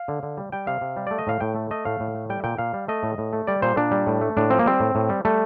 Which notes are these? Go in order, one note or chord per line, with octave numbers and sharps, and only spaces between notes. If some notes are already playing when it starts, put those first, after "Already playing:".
Already playing: F5
D3
D3
G3
G3 G5
C3 F5
C3
G3
A3 D5
D#5
A2 F5
A2 G5
A3
A3 D#5
A2 F5
A2
A3
G3 G5
A#2 G5
A#2 F5
G3
A3 D#5
A2
A2
A3
G3 D5
A#2 C5
A#2 D4
G3
A2
A3
A2 D4
F3 C4
A#3
G3 C4
A2
A2
G3
G3 A3